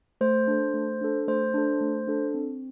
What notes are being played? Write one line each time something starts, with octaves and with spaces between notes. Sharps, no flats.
A3 C5
D4 A4
A3
D4 A4
A3 C5
D4 A4
A3
D4 A4
C4